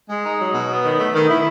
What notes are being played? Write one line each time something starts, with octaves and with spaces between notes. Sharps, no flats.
G#3
D#4
F#3
B2
B3
D#3
A3
D#3
E4